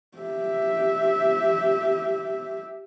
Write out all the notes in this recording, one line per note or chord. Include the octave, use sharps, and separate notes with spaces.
G4 E5